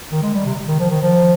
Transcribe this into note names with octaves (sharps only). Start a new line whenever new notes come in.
D#3
G#3
G3
C3
D#3
F3
D#3
F3